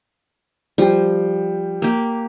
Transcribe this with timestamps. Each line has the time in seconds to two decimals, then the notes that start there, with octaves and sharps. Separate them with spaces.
0.78 F3 G3 G5
1.82 A#3 G4